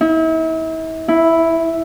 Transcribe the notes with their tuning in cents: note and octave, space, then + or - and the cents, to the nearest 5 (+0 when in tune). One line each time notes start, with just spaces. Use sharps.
E4 -40
E4 +0